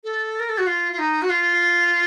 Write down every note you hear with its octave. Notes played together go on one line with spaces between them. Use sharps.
A4
A#4
A4
F#4
F4
F4
D#4
F#4
F4